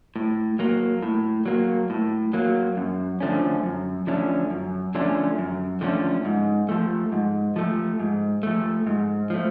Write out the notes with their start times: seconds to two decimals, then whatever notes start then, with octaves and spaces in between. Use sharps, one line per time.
0.16 A2
0.59 F#3 A#3
1.03 A2
1.46 F#3 A#3
1.90 A2
2.33 F#3 A#3
2.77 F#2
3.20 D3 F3 A3 C#4
3.63 F#2
4.07 D3 F3 A3 C#4
4.50 F#2
4.95 D3 F3 A3 C#4
5.38 F#2
5.81 D3 F3 A3 C#4
6.25 G#2
6.69 F3 A3
7.12 G#2
7.56 F3 A3
8.00 G#2
8.43 F3 A3
8.87 G#2
9.30 F3 A3